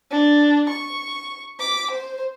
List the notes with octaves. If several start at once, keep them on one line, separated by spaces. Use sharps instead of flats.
D4
C#6
D6 B6
C5